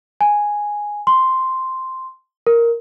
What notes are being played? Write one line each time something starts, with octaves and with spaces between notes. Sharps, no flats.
G#5
C6
A#4